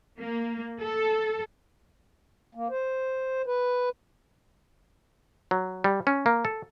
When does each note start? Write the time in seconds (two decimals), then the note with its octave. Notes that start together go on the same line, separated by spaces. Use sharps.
0.19 A#3
0.81 A4
2.55 A#3
2.70 C5
3.46 B4
5.51 F#3
5.84 G3
6.07 C#4
6.26 A#3
6.45 A4